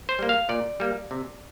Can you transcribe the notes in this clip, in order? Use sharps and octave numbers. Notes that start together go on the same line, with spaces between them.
C5
G3 A#3
F5
A#2 D5
G3 A#3
C3